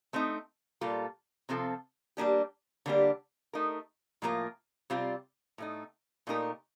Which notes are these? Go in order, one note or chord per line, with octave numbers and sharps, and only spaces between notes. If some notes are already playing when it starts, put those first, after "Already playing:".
A3 C4 D#4
A#2 G3 A#3 F4 A4
C3 F3 C4 F4 A4
G3 A#3 D4 G4
D3 G3 A#3 D4 G4
A3 D#4 A#4
A2 F3 A#3 F4 A#4
C3 G3 C4 F4
A2 A3 D#4
A#2 A3 D#4 G4 A#4